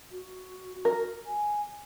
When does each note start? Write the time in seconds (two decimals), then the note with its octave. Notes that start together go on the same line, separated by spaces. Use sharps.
0.11 F#4
0.85 A#4
1.26 G#5